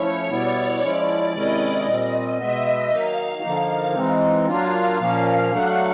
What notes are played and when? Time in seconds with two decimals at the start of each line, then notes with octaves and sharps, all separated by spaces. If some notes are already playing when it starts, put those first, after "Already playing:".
Already playing: F3 A3 C#4 E4 C#5
0.29 B2 G3 B3 E4 D5
0.82 F3 G#3 C#4 E4
1.33 C3 D#3 G#3 C#4 E4 D#5
1.87 A#2 G3 C4
2.38 B2 G#3 B3 E5
2.90 D#3 F#3 A#3 D#4 F5
3.42 D3 F3 A#3 D#4
3.94 E3 G#3 C4 D#4
4.47 F#3 A#3 D4 F4 F5
5.00 A#2 F3 A#3 C#4
5.51 F#3 A3 D4 F#5